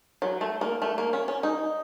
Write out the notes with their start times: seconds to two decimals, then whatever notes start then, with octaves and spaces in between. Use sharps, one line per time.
0.22 F#3
0.41 A3
0.61 A#3
0.82 A3
0.98 A#3
1.13 C#4
1.28 C#4
1.43 D#4